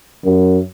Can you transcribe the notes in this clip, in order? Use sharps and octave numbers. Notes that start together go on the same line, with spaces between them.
F#2